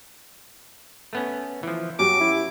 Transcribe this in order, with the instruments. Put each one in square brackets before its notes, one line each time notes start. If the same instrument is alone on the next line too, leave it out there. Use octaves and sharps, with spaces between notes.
[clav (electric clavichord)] A3 B3 C#4
E3 F3
[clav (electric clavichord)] F#2 [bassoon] F#3 [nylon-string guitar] B3 C#4 G4 [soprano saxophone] D6
[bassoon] E4